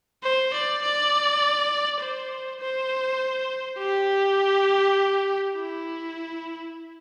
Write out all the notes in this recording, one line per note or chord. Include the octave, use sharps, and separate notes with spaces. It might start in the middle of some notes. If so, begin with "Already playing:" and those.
C5
D5
D5
C5
C5
G4
E4